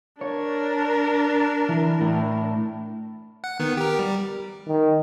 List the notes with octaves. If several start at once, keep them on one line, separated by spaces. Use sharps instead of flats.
D4 A#4 C#5
E3
A2
F#5
D#3 B3
G4 A#4
G3
D#3